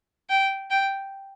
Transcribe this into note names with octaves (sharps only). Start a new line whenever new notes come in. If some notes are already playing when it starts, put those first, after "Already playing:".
G5
G5